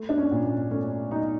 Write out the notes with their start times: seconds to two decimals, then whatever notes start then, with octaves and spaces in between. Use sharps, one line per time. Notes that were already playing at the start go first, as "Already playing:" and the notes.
Already playing: A3
0.09 D4
0.18 C#4
0.31 A#2
0.45 C#4
0.71 A3 C#4
1.11 F#3 D#4